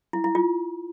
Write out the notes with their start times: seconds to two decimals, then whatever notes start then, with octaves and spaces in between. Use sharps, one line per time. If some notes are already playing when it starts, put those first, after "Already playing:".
0.13 E4
0.24 E4
0.35 F4